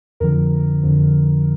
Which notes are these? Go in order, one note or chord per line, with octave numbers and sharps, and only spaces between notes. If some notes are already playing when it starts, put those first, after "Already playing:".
F2 D3 F3 A#4
F2 D3 F3